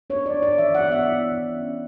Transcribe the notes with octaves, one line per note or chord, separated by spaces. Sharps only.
D4 C#5
D5
D4
D5
E3 E5
F#5
B3
E5
E4
E3
C#4